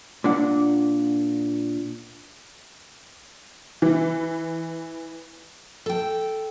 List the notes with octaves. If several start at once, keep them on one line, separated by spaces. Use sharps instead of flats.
A#2 D4 F#5
E3
A4 G5